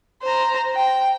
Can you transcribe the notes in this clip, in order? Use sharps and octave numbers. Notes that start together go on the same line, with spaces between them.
C5 A#5
G5